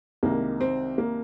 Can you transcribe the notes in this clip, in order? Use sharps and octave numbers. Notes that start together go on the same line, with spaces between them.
C2 C3 D#3 G#3 A#3
C4
A#3